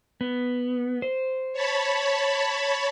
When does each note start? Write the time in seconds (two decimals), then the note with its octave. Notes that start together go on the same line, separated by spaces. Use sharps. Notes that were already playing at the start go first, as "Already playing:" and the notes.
0.21 B3
1.02 C5
1.53 C#5 A5 B5